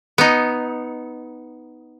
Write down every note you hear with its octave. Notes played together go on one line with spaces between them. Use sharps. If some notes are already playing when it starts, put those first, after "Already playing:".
B3 D#4